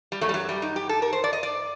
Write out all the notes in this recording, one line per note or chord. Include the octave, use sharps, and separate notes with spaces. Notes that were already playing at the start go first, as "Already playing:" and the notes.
G3
F#2 F#3 A3
G3
F#3
G3
D#4
G4
A4
A#4
C5
D5
D#5
D5